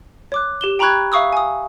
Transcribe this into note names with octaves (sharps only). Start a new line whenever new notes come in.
C#5 D6 F#6
G4 E7 G7
G5 A#5 B5 C#6 F#6 G#6
E5 F5 C#6 D#6 E6
G#5 D#6